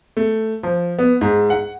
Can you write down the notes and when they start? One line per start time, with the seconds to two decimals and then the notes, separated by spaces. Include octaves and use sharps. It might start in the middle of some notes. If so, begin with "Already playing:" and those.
0.17 A3
0.63 F3
0.99 B3
1.21 G#2
1.50 F#5